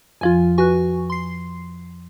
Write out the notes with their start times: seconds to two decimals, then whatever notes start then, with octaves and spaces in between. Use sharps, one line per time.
0.21 F2 F3 F4 G#5
0.58 F#4 B4 G#5 C#6 F#6
1.10 C6 C7